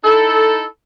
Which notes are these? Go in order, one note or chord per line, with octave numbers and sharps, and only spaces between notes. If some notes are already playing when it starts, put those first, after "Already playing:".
D#4 E4 A4